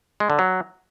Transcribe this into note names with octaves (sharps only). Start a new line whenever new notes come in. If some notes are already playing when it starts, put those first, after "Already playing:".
G#3
D3
F#3